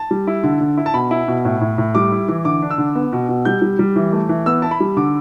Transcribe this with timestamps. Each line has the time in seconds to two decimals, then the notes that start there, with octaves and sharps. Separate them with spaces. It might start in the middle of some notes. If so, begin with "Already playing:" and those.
Already playing: A5
0.11 G3
0.27 E4
0.44 D3
0.61 D3
0.77 E4
0.86 A5
0.94 B2 B5
1.11 E4
1.28 B2
1.45 A2
1.61 A2
1.78 A2
1.95 G3 D6
2.12 E4
2.28 E3
2.45 D3 D6
2.62 D4
2.70 E6
2.78 D3
2.95 B3
3.13 B2
3.29 B2
3.45 G3 G6
3.62 G3
3.79 G3
3.96 E3
4.13 A3
4.29 E3
4.46 B3 E6
4.62 E4 A5
4.71 B5
4.80 G3
4.97 D3 D6